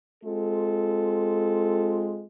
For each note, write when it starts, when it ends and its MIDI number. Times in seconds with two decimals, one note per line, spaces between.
0.24 2.23 56
0.24 2.23 60
0.24 2.23 65
0.24 2.23 69